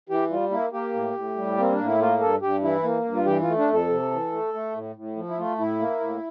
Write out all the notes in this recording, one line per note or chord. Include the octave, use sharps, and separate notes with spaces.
E3 G4
G3 F4
A#3 E4
A#3 G4
A2
A2
G3
A#3 C4
D4
A2
E4
A#3 F4
G2 A4
G2 G4
E3 E4
A#3
G2
F4
E3 G4
F4
A3
D4
F2 A4
C3
E3
A3
A3
A2
A2
F3
E4
A3 F4
A2 E4
A#3
A2